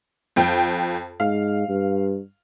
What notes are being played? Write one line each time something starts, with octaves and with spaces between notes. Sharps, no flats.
F2 G5
G#2 F5
G2